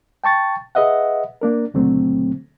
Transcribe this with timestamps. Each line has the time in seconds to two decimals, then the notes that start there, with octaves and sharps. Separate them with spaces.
0.24 G5 A5 C#6 A6
0.75 G#4 B4 D#5 E5 F#5
1.41 A#3 D4 A#4
1.74 C#2 A#2 D3 F#3 A3 C4